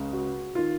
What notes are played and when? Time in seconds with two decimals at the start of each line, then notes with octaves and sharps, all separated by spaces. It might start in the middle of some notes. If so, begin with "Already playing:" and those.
Already playing: C#2 C#3
0.13 F#4
0.55 D#3 F4